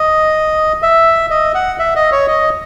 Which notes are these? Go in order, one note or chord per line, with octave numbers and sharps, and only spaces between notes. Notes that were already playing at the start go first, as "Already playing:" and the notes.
Already playing: D#5
E5
D#5
F#5
E5
D#5
C#5
D#5